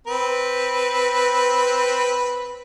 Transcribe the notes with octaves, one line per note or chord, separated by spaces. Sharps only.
C4 B4